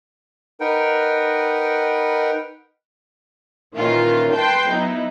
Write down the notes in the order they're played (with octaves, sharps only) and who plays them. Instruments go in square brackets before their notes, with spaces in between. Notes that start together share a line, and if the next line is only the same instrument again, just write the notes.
[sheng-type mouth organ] D#4 A#4 B4 F#5 G5
[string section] A#2 D#3 E3 C#4 F4
B4 G5 A5 C6 G6
F#3 B3 D#4 E4